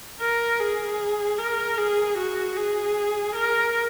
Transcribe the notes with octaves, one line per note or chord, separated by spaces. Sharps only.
A#4
G#4
A#4
G#4
F#4
G#4
A#4